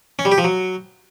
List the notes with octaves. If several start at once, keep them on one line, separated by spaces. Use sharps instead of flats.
C#4
G3
G4
F3
F#3